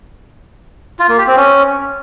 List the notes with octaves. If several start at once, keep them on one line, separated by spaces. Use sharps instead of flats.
F4
A#3
G4
C4
C#4